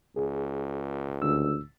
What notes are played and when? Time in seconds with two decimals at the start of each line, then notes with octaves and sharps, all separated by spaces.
0.16 C#2 G#4
1.22 D2 E6